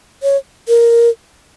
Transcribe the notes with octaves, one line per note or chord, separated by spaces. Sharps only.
C#5
A#4